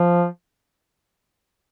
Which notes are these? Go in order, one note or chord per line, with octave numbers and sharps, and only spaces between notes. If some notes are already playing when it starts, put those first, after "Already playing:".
Already playing: F3